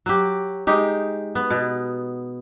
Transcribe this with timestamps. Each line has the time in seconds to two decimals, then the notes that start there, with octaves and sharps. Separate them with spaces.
0.06 F#3 G4
0.67 G#3 D#4 G4
1.35 B3
1.50 B2